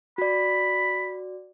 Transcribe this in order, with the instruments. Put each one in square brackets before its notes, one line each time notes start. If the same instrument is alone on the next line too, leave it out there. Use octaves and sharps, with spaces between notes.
[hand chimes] F#4 D5 [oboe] B5